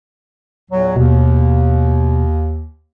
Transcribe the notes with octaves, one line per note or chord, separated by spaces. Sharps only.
E2 A#2 F#3
D#2 B2